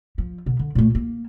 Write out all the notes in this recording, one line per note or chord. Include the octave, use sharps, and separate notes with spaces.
F3
B2 D3
D3
A#2 A3
A#3